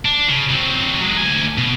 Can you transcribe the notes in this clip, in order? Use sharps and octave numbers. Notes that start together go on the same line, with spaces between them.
D4
C#3
F#3 C4
F#3 G#3
D2 G#5
B2